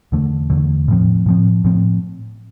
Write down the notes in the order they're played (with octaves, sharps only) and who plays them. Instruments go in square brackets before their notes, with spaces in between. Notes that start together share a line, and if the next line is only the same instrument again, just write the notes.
[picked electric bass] E2 D3 A3
E2 D3 A3
A2 F3 C4
A2 F3 C4
A2 F3 C4